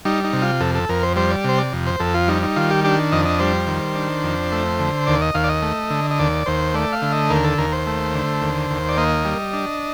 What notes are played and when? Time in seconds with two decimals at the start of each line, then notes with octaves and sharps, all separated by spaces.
0.05 G3 D#4
0.24 D#4
0.33 C3
0.42 F4
0.60 F2 A4
0.75 A4
0.89 F2 A#4
1.03 C5
1.16 G3 C5
1.30 D5
1.44 C3 C5
1.58 D5
1.73 F2
1.87 C5
2.00 F2 A4
2.14 F4
2.28 G3 D#4
2.43 D#4
2.56 D#3 F4
2.71 G4
2.84 D4 G4
3.12 F2 D#5
3.25 D#5
3.40 G3 C5
3.67 D#3
3.95 D4
4.23 F2
4.52 A3
4.79 D3
5.07 D#2 D5
5.22 D#5
5.34 D#2 F5
5.44 D5
5.49 D#5
5.62 A3
5.90 D3
6.11 D#5
6.19 D#2 D5
6.46 D#2 C5
6.74 A3 D5
6.93 F5
7.02 D3
7.12 D#5
7.30 D#2 A#4
7.44 A4
7.58 D#2 A#4
7.72 C5
7.87 A3
8.15 D3
8.41 D#2
8.70 D#2
8.89 D5
8.97 A#3 D#5
9.25 G3
9.53 D4